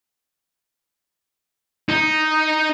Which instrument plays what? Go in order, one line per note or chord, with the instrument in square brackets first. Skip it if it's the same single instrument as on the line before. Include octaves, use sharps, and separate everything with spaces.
[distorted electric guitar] D#4